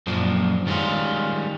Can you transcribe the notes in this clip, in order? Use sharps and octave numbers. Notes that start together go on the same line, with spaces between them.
F#2 A#2 F3 D4
D#3 G3 G#3 C#4 F4